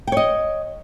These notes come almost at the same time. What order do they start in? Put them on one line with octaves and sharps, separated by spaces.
G5 C#5 D#5